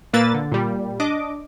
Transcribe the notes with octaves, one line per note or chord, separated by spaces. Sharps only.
A#2 A#3 B4 E6 A6
D3
A#2 G3
D4 D#5 D6